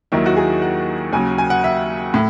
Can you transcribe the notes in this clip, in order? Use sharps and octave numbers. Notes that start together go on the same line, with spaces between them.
D#2 D#3 F#3 E4
F#4
G#4
F#5
D#2 C#3 F#3 G#5
G#5
F#5
E5
A2